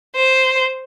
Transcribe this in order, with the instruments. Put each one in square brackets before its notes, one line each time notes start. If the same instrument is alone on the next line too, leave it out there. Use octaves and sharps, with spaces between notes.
[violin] C5